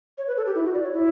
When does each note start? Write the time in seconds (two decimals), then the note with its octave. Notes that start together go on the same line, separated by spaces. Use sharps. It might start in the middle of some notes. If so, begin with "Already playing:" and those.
0.18 C#5
0.27 B4
0.37 A4
0.46 G4
0.55 E4
0.65 F#4
0.74 D5
0.84 C#5
0.93 E4